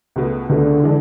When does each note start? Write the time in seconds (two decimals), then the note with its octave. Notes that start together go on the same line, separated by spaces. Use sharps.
0.16 C#2 B2 A3
0.49 C#2 B2 D3 A3
0.83 E3 G#3 D4